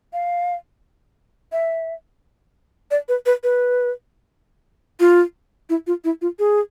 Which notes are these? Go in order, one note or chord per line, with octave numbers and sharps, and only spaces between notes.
F5
E5
D5
B4
B4
B4
F4
E4
F4
E4
F4
G#4